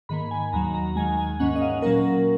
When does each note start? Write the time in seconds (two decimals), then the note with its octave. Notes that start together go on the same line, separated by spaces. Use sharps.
0.09 G#2 D#3 A#3 B5
0.31 G#5
0.53 D#2 D#3 F#3 A#5
0.74 A#5
0.96 D#2 D#3 G#3 G#5
1.17 G#5
1.40 G#2 D#3 A#3 C#4 F#5
1.56 D#5
1.61 F5
1.82 A#2 F#3 A#3 C#4 A#4